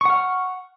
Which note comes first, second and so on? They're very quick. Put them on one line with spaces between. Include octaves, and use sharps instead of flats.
C#6 F#5 F6